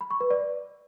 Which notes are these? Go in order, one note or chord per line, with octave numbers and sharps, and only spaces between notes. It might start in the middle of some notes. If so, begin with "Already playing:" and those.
B5
C#6
B4
D5